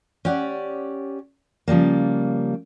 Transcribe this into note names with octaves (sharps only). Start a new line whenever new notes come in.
C#4 G4 D5 F#5
C#3 F3 G3 A#3